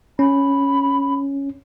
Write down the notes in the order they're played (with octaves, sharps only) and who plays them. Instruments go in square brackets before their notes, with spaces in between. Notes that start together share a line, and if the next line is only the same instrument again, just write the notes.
[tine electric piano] C#4 [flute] B5